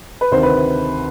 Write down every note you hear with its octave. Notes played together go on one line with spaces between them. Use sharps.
B4
D2 C3 D#3 C5
B4